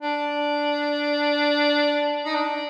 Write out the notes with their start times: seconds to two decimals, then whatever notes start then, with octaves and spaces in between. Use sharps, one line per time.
0.02 D4
2.26 D#4
2.35 D4